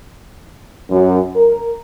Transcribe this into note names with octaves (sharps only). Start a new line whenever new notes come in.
F#2
A#4